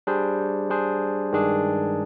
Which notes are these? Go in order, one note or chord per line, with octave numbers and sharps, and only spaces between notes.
G3 D4 G#4 C5
G3 D4 G#4 C5
G2 D#3 G#3 D4 G#4